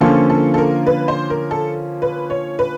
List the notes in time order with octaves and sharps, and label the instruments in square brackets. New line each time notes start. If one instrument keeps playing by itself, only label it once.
[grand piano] D3 F3 A#3 C#4 F4 [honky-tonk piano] A4
[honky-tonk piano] A4
A4
A#4
B4
C5
A#4
A4
B4
C#5
B4